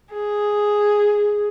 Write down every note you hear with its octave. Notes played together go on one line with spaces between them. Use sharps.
G#4